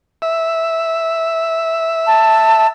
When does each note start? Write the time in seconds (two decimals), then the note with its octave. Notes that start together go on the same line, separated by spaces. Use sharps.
0.22 E5
2.07 A5